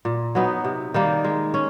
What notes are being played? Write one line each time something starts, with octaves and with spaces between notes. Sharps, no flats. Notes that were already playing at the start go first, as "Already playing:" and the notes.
A#2
F#3 B3 D#4
C3
D#3 G3 A#3
G#3
C#4